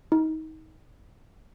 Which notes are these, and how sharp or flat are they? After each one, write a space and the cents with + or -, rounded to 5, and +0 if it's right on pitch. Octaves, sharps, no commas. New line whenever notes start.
D#4 +25